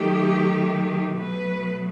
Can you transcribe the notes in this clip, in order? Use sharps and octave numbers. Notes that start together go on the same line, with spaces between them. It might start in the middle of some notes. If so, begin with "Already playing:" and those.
Already playing: D#3 F#3 A3 G4
B2 F#3 A3 B4